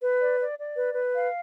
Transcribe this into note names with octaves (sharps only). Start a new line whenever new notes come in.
B4
D5
D5
D5
B4
B4
F5